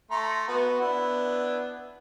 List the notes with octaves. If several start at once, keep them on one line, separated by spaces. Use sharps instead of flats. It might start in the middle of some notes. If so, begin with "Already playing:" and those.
A3 A#5 C6
B3 F#4
B3 D4 E4